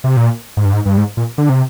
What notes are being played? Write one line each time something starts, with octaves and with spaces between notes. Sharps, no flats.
C3
A#2
G#2
G2
G#2
G2
G#2
A#2
D3
C3